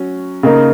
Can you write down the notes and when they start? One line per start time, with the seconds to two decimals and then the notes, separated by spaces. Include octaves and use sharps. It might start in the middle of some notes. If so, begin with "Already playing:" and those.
Already playing: F#3 C#4
0.43 C#3 A#3 D#4 A#4